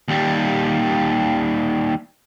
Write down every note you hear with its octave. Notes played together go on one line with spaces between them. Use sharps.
D#2 G3